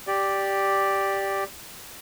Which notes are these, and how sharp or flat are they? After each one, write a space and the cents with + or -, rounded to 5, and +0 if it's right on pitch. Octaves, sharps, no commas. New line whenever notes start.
G4 +0 D5 +0